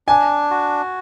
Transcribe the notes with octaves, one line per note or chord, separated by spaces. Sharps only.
D4 G#5
F#4